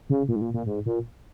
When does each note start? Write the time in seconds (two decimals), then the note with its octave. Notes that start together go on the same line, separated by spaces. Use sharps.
0.10 C#3
0.28 A#2
0.36 G#2
0.41 A#2
0.54 A#2
0.66 G#2
0.86 A#2